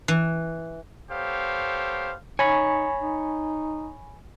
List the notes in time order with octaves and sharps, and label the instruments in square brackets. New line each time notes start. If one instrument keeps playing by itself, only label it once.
[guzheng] E3
[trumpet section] B3 G4 A4 C5 C#5 F5
[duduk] D#4 [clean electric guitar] C#5 [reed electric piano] G#5 B5 C#6
[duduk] D#4